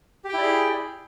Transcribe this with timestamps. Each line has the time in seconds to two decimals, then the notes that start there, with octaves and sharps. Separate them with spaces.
0.24 G4
0.29 G5
0.34 E4
0.38 D5
0.43 G#4